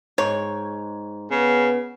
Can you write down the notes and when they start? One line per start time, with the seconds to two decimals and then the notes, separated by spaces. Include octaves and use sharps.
0.18 G#2 C#5
1.31 C#3 B3